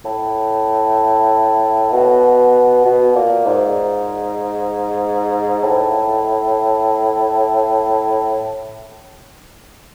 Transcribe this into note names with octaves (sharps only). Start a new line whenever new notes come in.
A2
B2
B2
A#2
G#2
A2